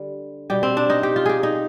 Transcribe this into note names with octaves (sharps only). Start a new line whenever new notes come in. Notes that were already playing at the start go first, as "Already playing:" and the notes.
Already playing: D3 G3
B2 G3 G4
C4
D4
D#4
G4
F4
G4 G#4
D#4